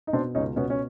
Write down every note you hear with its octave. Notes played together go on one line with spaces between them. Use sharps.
D#4
B2 C4 D4
C#2 C#4 D#4
B2 B3 C#4
C#4